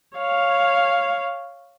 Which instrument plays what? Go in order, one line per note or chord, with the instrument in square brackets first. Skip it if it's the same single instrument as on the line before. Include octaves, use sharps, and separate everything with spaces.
[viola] C#5 F5